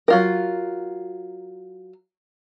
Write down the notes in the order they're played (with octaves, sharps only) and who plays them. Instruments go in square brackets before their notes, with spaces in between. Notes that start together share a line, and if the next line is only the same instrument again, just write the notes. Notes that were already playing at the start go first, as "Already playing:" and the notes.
[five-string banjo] F#3 F4 A#4